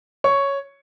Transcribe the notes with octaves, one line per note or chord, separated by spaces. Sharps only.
C#5 C#6